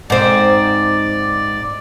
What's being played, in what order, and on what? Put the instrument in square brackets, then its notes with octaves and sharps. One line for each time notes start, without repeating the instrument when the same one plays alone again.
[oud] G#2 C4 [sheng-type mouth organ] D5